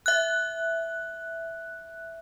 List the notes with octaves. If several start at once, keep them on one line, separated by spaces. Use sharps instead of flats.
E5 F#6